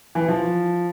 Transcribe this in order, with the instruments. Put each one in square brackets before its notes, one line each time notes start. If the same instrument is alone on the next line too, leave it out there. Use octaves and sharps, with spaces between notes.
[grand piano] E3
F3